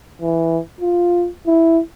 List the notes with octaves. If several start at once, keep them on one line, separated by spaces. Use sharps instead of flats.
E3
F4
E4